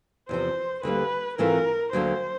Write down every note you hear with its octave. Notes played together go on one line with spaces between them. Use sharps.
E2 C3 F3 C5
D2 D3 G3 A#3 B4
G#2 E3 A3 C4 F4 A#4
D2 D3 F#3 A#3 D4 C5